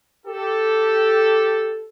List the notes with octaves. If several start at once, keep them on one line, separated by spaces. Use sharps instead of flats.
G4 A4